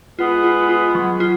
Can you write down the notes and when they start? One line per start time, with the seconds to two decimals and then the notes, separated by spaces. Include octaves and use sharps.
0.18 G#3 B3 F4
0.44 F4
0.69 F4
0.95 F#3
1.20 F4